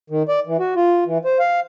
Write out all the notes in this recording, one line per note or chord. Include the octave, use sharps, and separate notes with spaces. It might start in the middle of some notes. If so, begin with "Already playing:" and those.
D#3
D5
E3
F#4
F4
E3
C5
F5